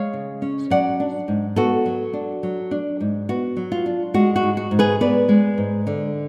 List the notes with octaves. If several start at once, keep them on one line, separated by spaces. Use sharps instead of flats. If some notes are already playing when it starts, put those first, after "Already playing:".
Already playing: G#3 C#5 F5
C#3
C#4
F#3 D5 F#5
D4
G#2
B3 F#4 A4
F#3
D4
F#3
D4
G#2
B3 F#4
F#3
F4
D4
G#3 F#4
F#4
G#2
F#4
G#2
G#4 B4
B3 B4 D5
G#3
G#2
D3